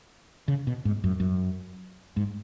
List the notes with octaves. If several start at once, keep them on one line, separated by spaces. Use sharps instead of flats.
C#3
B2
G#2
F#2
F#2
G#2